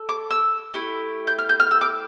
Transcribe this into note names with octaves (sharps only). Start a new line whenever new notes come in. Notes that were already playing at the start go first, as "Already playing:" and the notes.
Already playing: A4
D6
E6
A3 E4 G4
G6
F6
G6
F6
E6
D6